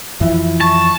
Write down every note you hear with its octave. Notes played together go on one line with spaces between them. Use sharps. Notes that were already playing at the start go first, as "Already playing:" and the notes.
F2 E3 F3 E4
A5 C#6